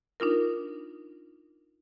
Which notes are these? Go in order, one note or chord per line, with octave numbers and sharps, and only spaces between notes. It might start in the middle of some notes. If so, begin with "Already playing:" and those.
D4 D#4 F4 A#4